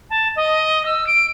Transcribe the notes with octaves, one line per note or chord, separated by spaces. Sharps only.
A5
D#5
E6
D7